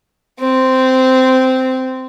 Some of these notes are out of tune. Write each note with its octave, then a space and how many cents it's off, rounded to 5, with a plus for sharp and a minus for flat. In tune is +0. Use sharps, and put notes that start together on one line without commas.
C4 -10